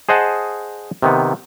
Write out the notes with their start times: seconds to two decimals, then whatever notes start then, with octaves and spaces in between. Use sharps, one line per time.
0.09 G#4 C5 D#5 F#5 A5
1.02 C3 D#3 B3